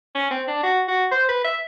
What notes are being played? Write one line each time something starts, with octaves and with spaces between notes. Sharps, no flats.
C#4
C4
D4
F#4
F#4
C5
B4
E5